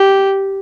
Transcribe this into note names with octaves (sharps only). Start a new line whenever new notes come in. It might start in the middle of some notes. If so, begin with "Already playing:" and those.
Already playing: G4